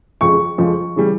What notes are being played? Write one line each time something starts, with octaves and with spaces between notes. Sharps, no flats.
F2 C#3 F3 G#3 C#6
F2 C#3 F3 G#3
C#3 E3 G3